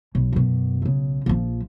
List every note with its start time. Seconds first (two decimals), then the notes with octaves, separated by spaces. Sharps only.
0.15 B1
0.33 F#2 B2
0.82 B1 C#3
1.26 A#1 F3